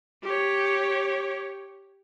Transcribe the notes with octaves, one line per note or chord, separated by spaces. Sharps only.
G4 C#5